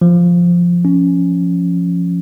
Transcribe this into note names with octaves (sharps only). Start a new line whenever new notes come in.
F3
C#4